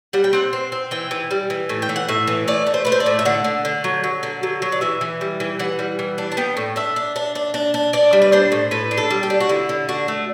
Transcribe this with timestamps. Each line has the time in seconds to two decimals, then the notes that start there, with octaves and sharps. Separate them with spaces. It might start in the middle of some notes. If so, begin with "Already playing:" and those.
0.13 G3 F#5
0.24 G5
0.33 C4 F#5
0.53 C4
0.72 C4
0.91 E3 G5
1.11 E3
1.31 G3
1.50 E3
1.69 A2
1.82 G5
1.89 E3
1.96 F#5
2.09 A2 E5
2.27 E3
2.48 A3 D5
2.67 A3
2.74 C5
2.85 A3 B4
2.92 C5
3.00 D5
3.06 A2
3.19 E5
3.25 D3 F#5
3.44 D3
3.65 D3
3.84 F#3
4.04 F#3
4.23 D3
4.43 F#3
4.62 F#3
4.72 D5
4.81 E3 E5
5.01 E3
5.21 G3
5.40 E3
5.59 E3 F#5
5.79 G3
5.99 E3
6.18 D4
6.32 A5
6.37 B3 G5
6.57 A2
6.76 D4 E5
6.96 D4
7.16 D4
7.35 D4
7.54 D4
7.74 D4
7.93 D4 D5
8.13 G3
8.22 B4
8.32 D4 C5
8.52 A2
8.71 A2 B4
8.91 D4
8.98 A4
9.10 G3
9.23 G4
9.30 D4
9.40 F#4
9.49 D3 E4
9.69 D3
9.89 D4 F#4
10.08 A3